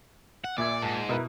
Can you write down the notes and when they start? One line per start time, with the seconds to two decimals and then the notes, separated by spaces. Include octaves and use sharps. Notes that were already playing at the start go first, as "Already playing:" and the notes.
0.44 F#5
0.58 A#1 A#2 D5 E5 G#6
0.82 G#2 A5
1.09 B2 E4 A#4 B4